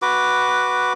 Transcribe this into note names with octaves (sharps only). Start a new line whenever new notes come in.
F#4 B4 D6